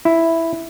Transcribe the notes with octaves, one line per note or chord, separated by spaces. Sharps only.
E4